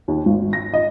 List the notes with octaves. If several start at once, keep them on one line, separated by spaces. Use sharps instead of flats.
D#2
G#1
A#6
D#5